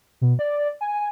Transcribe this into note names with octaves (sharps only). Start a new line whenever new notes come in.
B2
D5
G#5